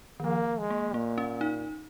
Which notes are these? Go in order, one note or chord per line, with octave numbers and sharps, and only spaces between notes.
D#3
F3 A#3
G#3
A#3
A#2 A#3
C#4
D#4